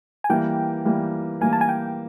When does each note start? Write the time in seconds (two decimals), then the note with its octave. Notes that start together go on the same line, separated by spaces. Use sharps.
0.24 G#5
0.30 E3 G3 A#3 G5
0.85 E3 G3 A#3
1.41 E3 G3 A#3 G#5
1.53 A5
1.61 G#5
1.69 G5